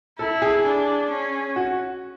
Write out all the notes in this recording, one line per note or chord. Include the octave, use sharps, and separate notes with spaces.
E4 A4
G#4
D4
C#4
F#4